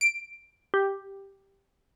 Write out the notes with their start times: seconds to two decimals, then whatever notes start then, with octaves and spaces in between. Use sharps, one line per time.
0.01 D7
0.74 G4